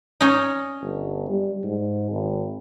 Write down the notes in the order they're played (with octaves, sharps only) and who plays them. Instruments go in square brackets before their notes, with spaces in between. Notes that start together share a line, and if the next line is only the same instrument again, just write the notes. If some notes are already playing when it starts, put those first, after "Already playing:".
[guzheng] C#4 D#4
[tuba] G1
G3
G#2
G#1